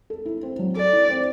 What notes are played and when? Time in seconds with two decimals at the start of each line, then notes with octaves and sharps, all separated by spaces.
0.10 A4
0.26 E4
0.43 C4
0.59 F#3
0.76 A4 D5
0.93 E4
1.10 C4